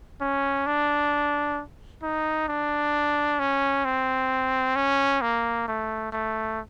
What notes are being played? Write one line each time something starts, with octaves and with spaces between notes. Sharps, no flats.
C#4
D4
D#4
D4
C#4
C4
C#4
A#3
A3
A3